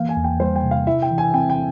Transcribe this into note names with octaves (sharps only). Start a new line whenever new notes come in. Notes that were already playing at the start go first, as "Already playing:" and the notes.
Already playing: E3 A#3 F5
G#5
E2
G5
G3 C5
G5
C3
F5
E4 E5
G5
E3
G#5
C4 G5
G5